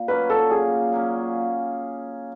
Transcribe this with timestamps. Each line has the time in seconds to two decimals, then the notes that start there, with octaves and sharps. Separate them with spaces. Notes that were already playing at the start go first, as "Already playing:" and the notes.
Already playing: A#2
0.08 F#3 A#3 C#4 B4
0.30 A4
0.50 A#2 G#4
0.92 F#3 A#3 C#4